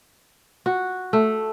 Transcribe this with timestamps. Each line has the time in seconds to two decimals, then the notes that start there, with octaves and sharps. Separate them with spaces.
0.66 F#4
1.13 A3